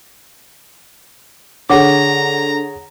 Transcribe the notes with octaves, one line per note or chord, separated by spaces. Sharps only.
D3 G#4 C#5 F#5 A#5 D6